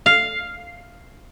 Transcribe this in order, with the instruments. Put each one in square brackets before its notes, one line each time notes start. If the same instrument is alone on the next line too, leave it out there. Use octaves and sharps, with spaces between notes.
[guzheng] F5